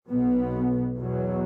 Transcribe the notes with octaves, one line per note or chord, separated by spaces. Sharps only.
B1 B2 B3
E2 B2 F#3